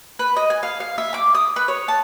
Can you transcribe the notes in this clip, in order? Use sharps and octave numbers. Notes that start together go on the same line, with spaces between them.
B4
D#5
G#5
F5
F5
E5
D6
D#6
B4
C#5
A5